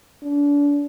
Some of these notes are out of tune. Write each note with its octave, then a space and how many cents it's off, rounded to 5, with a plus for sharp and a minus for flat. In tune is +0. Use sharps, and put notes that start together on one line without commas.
D4 -35